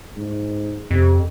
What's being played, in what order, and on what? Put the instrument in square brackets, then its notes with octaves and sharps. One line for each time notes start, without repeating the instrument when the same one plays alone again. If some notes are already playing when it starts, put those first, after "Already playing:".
[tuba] G#2
[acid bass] F2 [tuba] C3